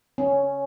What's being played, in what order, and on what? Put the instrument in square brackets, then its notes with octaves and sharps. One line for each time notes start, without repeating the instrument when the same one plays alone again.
[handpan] C#4